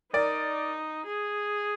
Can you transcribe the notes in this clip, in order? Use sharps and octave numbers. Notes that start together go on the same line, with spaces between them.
D#4 A#4 D5
G#4